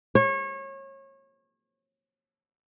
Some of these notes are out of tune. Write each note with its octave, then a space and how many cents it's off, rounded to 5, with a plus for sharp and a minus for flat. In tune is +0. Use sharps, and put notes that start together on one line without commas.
C#5 -30